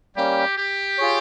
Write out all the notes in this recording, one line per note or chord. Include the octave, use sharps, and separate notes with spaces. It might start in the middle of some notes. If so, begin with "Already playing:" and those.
G3 A#3 C#4 G4
G4
F4 G#4 C#5